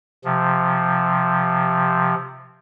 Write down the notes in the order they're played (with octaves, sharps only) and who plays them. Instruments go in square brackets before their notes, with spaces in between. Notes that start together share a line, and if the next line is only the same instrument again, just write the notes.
[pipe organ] C3 F3